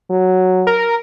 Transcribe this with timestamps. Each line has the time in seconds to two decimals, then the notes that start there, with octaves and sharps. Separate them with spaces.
0.10 F#3
0.67 A#4